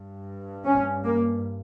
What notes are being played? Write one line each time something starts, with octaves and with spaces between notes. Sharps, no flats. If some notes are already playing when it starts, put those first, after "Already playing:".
Already playing: G2
C#4
A#3